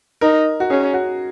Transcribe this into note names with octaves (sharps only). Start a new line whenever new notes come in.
D#4 A#4
F#4
C#4 G#4
F#4